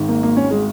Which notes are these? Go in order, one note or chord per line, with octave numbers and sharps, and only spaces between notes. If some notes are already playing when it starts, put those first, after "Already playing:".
Already playing: G#1 G#2 D#3
A#3
A#3
C#4
G#3